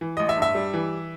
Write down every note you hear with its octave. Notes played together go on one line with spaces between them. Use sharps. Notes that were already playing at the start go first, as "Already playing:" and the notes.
E3
A1 D#5
E5
G2
E5
G3
E3